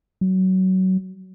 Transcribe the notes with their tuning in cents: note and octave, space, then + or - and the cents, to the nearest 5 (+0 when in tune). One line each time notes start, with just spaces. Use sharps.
F#3 +20